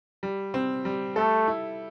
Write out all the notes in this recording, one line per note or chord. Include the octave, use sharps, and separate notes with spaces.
G3
C4
G3
A3 A4
E4